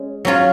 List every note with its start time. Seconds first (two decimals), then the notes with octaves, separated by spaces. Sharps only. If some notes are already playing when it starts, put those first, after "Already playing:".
Already playing: G#3 C#4
0.25 F#3 C#4 F4